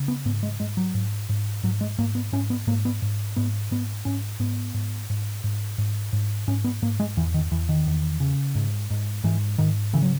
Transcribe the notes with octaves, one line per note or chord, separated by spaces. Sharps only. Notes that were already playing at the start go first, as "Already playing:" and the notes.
Already playing: C#3
B3
G#2 B3
G#3
G#2 G#3
F#3
G#2
G#2
G#2 F#3
G#3
G#2 A#3
B3
G#2 C#4
B3
G#2 A#3
B3
G#2
G#2 B3
G#2 B3
G#2 C#4
G#2 B3
G#2
G#2
G#2
G#2
G#2
G#2 C#4
B3
G#2 A#3
G#3
E2 E3
D#3
E2 E3
D#3
E2
C#3
G#2
G#2
G#2 E3
G#2 D#3
C#3 E3
F#3